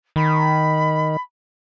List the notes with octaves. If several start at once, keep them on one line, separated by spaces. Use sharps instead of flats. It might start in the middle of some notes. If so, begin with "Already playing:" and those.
D#3 B5